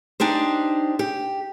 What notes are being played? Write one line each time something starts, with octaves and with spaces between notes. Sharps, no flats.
D4 D#4 G4 C5
G4